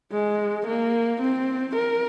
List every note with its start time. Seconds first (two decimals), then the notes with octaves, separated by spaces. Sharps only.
0.12 G#3
0.67 A#3
1.22 C4
1.76 A#4